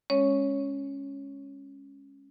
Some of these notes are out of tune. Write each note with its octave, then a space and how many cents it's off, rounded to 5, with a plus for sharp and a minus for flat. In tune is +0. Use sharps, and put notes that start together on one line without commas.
G#3 -5 C#4 +0 C#5 +0